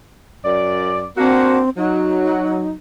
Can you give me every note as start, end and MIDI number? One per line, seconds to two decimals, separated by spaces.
0.45 1.07 42
0.45 1.07 74
1.17 1.59 58
1.17 1.69 60
1.17 1.59 62
1.17 1.59 66
1.77 2.73 54
1.77 2.69 63